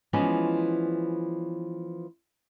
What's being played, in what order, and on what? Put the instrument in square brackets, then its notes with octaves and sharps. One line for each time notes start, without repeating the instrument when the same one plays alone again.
[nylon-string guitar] E3 F3 G#3 B3 C#4